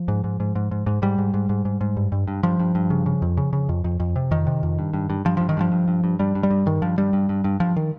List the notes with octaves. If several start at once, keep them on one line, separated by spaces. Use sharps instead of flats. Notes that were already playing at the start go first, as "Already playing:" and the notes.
Already playing: F3
G#2
G#2
G#2
G#2
G#2
G#2
G#2 G3
G#2
G#2
G#2
G#2
G#2
G2
G2
G2
G2 F3
G2
G2
C#3
C#3
F2
C#3
C#3
F2
F2
F2
C3
F2 D#3
C3
F2
G2
G2
G2
G2 F3
G2 F3
D#3
G2 F3
G2
G2
G2
G2 G3
G2
G3
G2
G2 D#3
G2 F3
G2 G3
G2
G2
G2
G2 F3
D#3